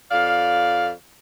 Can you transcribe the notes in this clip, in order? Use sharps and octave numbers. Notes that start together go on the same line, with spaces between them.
F2 D5 F5